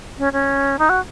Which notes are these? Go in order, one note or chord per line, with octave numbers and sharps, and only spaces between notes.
C#4
C#4
D#4
F#4